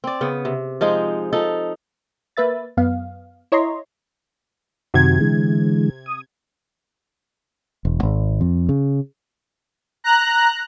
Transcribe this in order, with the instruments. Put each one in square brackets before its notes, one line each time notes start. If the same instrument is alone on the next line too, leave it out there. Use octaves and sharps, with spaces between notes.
[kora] C4 D5
C#3 B3
C3
F3 G#3 D#4 C5
F3 D#4 A4
[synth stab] A#3 B4 E5 A6
F#2 B3 F5
E4 C#5 D#5 A#5 C6
[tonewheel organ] F#2 D#3 F#4 [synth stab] C3 G#6
[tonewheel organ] D3 E3 G#3
D#6
[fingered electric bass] E1
G#1
F2
C#3
[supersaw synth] A#5 F#6